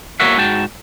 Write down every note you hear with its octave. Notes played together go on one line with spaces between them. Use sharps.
E2 A#3 F#4 C#5 E5 F#5
G#2 F#4 G5 A5